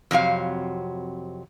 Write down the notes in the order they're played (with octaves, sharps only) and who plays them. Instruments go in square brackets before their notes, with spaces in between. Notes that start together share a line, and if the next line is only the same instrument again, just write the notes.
[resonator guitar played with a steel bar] F2 C3 F#3 F5